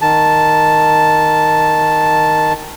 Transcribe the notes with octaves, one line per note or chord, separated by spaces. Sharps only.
D#3 A5